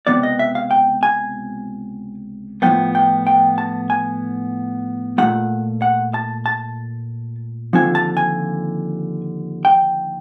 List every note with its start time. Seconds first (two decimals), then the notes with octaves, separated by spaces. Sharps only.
0.07 C#2 C3 D#3 F#3 B3 D5
0.23 D#5
0.39 E5
0.55 F5
0.71 G5
1.03 G#5
2.62 A2 F3 G#3 B3 G5
2.95 G5
3.27 G5
3.58 A5
3.90 G#5
5.18 A#2 F3 A3 F#5
5.82 F#5
6.14 A5
6.46 A5
7.73 D#2 D3 F3 C4 G#5
7.95 A5
8.17 G#5
9.65 G5